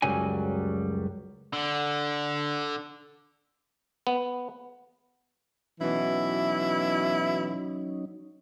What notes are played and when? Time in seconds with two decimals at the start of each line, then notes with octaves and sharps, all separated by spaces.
0.02 C#2 F#2 F#3 G3 G#5
1.53 D3
4.07 B3
5.81 B2 E3 F#3 C#4 D#4 E4